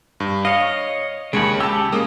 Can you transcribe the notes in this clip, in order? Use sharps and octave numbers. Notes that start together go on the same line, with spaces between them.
G2
C#5 D#5 F5
D#2 C#3 G#3 C#5 B5
C#3 G4 A5 E6
C#3 G#3 A#3 D#6